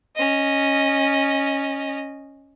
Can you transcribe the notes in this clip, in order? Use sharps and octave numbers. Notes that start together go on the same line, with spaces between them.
C#4 D#5